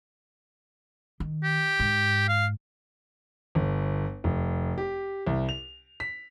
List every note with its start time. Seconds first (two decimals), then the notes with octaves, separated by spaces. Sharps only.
1.20 D#3
1.44 G4
1.80 G#2
2.29 F5
3.55 G1
4.24 F1
4.78 G4
5.27 C2
5.49 F7
6.00 B6